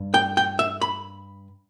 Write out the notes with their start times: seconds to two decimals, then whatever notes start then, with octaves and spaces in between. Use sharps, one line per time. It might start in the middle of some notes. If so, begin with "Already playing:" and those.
Already playing: G2
0.14 G5
0.37 G5
0.59 E5
0.82 B5